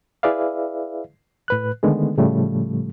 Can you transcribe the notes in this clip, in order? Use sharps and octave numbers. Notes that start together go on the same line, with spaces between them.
E4 G#4 B4 D5 E5 F5
A2 B4 F#6
D3 D#3 G#3 A3 B3
A2 C#3 F3 G3 A3